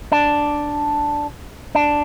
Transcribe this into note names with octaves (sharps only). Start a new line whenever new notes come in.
D4
D4